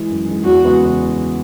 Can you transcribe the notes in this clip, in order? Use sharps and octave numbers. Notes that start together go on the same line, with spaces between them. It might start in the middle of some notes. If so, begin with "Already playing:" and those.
Already playing: E3 G#3
F#2
E3 G#3
E2 F#4
C#3 G#3 B3 E4